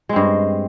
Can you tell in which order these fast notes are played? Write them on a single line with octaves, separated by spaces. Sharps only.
G#3 C4 G2